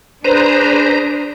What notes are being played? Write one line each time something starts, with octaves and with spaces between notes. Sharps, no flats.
D4 G#4 B4 C5 A#5